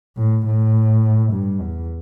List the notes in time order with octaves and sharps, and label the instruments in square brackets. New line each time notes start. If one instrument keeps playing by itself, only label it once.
[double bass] A2
A2
G2
E2